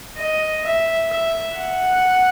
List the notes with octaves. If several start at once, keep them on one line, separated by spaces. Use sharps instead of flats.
D#5
E5
E5
F#5